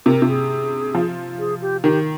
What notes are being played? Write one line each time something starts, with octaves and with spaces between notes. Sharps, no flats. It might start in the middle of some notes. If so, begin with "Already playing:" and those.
C3 A#4
C3
G#4
F3
G#4
G4
D#3 G4